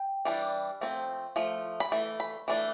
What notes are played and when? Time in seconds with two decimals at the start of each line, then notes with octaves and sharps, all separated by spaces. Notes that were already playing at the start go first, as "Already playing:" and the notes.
Already playing: G5
0.25 E3 G3 D4
0.81 F3 A3 C4
1.36 F3 A3
1.80 B5
1.92 E3 A3
2.20 B5
2.48 E3 A3 D4